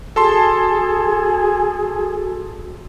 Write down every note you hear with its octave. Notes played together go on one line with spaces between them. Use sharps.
F#4 G#4 A4 A5 C6